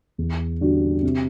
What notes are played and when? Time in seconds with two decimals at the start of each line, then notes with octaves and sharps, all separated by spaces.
0.18 E2
0.61 D3 G3 D4 F#4
1.03 C3